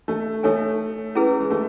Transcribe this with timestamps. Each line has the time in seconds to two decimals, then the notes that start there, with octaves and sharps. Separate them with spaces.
0.08 A3
0.43 A3 D#4 A4 C#5 E5 G#5
1.15 C#4 E4 G#4 B4
1.40 G#3
1.51 A3